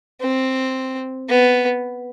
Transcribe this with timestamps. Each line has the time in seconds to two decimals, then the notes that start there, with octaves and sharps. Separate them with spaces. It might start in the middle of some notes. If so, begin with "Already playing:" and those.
0.21 C4
1.29 B3